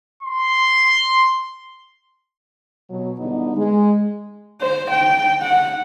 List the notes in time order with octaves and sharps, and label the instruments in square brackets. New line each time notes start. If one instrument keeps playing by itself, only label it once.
[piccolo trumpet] C6
[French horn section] B2 F#3
E2 D3 E3 G3 B3 D#4
G#3
[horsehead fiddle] C5
G5
F#5